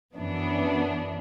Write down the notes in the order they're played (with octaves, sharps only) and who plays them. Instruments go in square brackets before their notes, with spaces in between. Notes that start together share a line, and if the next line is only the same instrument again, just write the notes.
[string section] F#2 E3 B3 D4